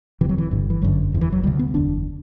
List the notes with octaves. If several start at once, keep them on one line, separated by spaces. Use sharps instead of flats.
E1 D2 C3 E3
F#3
E3
G1 G2 D3
E3
G1 F#2 D3 F#3
F#1 E2 C3
E3
F#3
D2 C3 G3
B3
F#1 E2 D3 D4